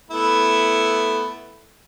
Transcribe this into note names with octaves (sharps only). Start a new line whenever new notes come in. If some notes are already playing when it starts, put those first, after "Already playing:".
A3 B3 E4